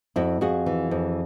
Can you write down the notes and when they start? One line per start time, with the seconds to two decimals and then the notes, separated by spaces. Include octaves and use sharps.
0.16 F2 E4 F#4
0.41 F2 F#4 G#4
0.66 E3
0.91 F2